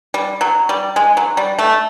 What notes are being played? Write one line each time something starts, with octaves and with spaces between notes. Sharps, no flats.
G3
F#3
G3
G#3
F#3
G3
A3